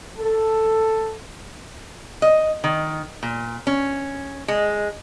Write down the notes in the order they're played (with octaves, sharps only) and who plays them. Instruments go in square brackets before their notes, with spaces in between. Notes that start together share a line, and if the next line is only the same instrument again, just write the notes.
[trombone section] A4
[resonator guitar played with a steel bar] D#5
D#3
A#2
C#4
G#3